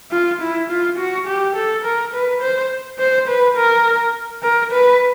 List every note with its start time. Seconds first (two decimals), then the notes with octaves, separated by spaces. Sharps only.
0.11 F4
0.41 E4
0.69 F4
0.98 F#4
1.27 G4
1.55 A4
1.84 A#4
2.13 B4
2.41 C5
2.98 C5
3.28 B4
3.56 A#4
4.43 A#4
4.72 B4